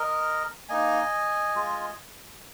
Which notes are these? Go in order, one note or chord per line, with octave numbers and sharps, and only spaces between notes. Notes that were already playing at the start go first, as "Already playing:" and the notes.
Already playing: A#4 D#5
A#3 D#4 D#5 G#5
G#3 F4